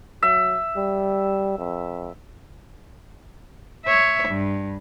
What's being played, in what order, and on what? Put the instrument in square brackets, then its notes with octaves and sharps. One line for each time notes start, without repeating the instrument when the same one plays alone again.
[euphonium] F#3 [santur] E5
[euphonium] G3
F2
[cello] C#5 E5
G2